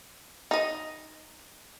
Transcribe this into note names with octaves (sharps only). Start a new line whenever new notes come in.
D#4 D#5